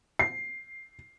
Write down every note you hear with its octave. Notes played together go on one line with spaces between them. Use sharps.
C7